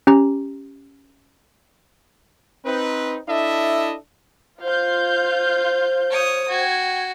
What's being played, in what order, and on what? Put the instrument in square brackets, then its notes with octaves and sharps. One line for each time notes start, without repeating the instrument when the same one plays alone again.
[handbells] C#4 G4 A#5
[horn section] C4 D#4 B4
D4 E4 A4 D#5 E5
[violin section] F4 F5 G6 [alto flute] C5
[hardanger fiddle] C#5 D#6
[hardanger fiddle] F#4 [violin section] G5 G#6